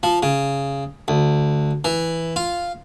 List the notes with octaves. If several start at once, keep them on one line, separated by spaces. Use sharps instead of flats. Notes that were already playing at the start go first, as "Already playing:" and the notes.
F3
C#3
D2
E3
F4